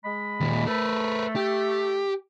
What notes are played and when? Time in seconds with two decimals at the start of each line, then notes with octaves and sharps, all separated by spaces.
0.04 G#3 D#5 B5
0.40 D#2 A#2
0.67 A3 A#4 B4
1.36 G4